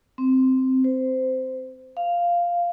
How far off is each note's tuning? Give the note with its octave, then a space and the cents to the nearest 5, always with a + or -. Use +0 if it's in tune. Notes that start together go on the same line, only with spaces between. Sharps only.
C4 -5
C5 -15
F5 -5